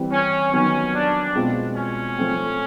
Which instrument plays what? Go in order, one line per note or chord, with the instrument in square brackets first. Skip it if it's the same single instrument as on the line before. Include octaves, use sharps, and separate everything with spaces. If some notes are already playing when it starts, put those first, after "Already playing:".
Already playing: [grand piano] E3 G3 C4
[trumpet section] C#4
[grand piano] D#3 F#3 B3 [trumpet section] C#4
[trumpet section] D4
[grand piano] B2 G#3 C4 F4
[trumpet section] C#4
[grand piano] F3 A3 C4